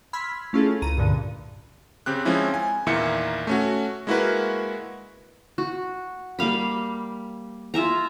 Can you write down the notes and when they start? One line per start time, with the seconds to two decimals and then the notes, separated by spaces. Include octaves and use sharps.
0.13 B5 C6 E6 F6 G#6 B6
0.53 A3 C#4 E4 F4 G#4 A4
0.82 C#2 A#5 D#7
0.97 C#2 G2 A#2 D3
2.06 C#3 C4 G4 F#6
2.25 F3 G#3 C4 C#4 E4
2.54 G#5
2.86 E2 A#2 D#3 E4 E5 C#7
3.47 A3 C#4 F#4
4.07 G#3 A#3 E4 F#4 A#4 B4
5.58 F#4
6.39 G3 A#3 F5 B5
7.74 F4 E5 G#5 A#5